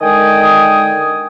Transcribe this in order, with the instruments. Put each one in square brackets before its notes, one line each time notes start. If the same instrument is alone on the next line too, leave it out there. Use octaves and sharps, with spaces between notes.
[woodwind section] D3 D#3 G#3 G5 G#5 D#6